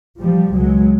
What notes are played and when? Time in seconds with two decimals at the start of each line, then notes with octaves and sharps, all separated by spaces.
0.18 F3 G3
0.52 C#2 B2 F#3 G#3